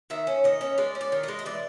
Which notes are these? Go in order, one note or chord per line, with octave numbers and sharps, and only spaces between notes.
D#3 E5
C#4
D#3 D#5
C#4
G#3 D5
C#4
D5
D#3
G#3 D#5
D#5
E3 D5